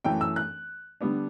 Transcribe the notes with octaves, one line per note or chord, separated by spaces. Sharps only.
F#2 E3 A3 G5
E6
F#6
D3 G3 B3 D4